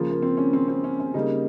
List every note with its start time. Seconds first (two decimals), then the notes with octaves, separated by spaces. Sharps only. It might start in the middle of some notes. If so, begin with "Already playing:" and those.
Already playing: C#3 F3 A#3 F4
0.11 A#3
0.22 C4
0.37 C#4
0.53 C4
0.68 C4
0.84 C#4
1.00 C#4
1.14 C#3 G3 A#3 D#4